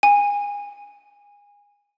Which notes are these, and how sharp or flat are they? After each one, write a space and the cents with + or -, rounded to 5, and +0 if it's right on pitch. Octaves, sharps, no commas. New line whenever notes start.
G#5 -25